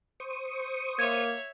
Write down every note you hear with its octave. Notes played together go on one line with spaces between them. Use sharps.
C5 C#6 D#6
A#3 C#5 E5 G#6